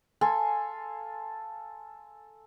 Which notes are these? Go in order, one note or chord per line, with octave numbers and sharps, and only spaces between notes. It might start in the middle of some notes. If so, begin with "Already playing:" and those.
A4 F5 G#5 C6